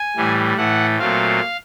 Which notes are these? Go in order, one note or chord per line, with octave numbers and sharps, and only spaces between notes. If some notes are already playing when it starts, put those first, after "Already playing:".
Already playing: G#5
A2 E3 G3
A2 E3 A3 F#5
A#2 F#3 A3 C4 F5